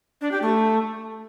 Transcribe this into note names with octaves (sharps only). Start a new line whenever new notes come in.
D4
G4
A3